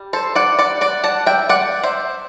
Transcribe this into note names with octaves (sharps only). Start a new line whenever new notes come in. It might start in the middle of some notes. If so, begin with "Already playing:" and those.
Already playing: G3
A4 C5
D5 F#5
D5 F#5
D5 F#5
F#5 A5
E5 G5
D5 F#5
C5 E5